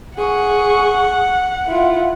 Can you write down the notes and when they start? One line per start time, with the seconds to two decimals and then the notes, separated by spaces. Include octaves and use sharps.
0.18 G#4 F#5 C#6
1.66 E4 F4